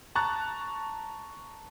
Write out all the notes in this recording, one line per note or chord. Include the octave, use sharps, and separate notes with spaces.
A5 A#5 C#6 F#6 A6